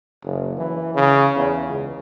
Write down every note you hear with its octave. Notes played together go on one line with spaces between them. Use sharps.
F#1
E3
C#3
E2
C#2